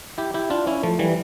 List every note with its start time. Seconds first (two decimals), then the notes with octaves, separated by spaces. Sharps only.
0.18 E4 G4
0.34 E4 G4
0.50 D4 F4
0.67 C#4 E4
0.83 F3 A3
0.99 E3 G3